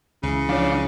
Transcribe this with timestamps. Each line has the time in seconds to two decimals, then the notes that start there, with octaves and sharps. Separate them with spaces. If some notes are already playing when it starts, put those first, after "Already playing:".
0.23 C#2 C#3 E3
0.49 F3 D4 C#5 F5